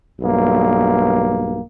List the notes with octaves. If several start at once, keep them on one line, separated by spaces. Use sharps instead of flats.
B1 G2 A#3